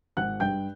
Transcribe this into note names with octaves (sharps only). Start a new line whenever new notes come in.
G#1 F#5 F#6
G2 G5 G6